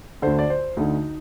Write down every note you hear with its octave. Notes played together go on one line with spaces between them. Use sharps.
D2 D3 C5
D5
C5
D2 D3 D#4